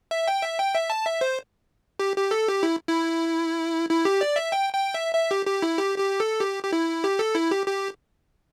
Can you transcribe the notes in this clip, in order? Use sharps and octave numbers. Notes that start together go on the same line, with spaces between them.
E5
G5
E5
G5
E5
A5
E5
C5
G4
G4
A4
G4
E4
E4
E4
G4
D5
E5
G5
G5
E5
E5
G4
G4
E4
G4
G4
A4
G4
G4
E4
G4
A4
E4
G4
G4